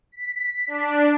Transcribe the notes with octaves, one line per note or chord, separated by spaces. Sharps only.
B6
D4